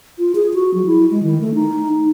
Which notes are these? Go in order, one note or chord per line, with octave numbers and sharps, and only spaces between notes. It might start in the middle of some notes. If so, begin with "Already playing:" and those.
F4
G#4
F#4
F#3
E4
G#3
D#3
A3
D#4